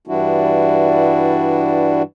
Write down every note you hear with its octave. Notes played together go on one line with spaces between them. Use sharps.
G2 E3 G3 D4 E4 F#4